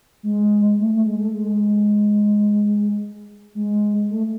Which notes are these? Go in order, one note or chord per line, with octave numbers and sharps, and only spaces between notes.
G#3
A3
A3
G#3
A3
G#3
G#3
A3